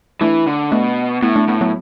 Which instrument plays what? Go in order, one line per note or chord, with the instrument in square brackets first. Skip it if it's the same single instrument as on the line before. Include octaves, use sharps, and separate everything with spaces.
[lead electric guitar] E3 [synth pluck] A3 D4
[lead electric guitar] D3
[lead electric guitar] B2 [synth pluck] A3 D4
[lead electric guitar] A2 [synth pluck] B3 E4
[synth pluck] A3 D4
[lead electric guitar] A2 [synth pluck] B3 E4
[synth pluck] F#3 B3